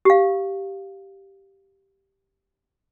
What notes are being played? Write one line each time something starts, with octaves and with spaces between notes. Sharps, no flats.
G4 F5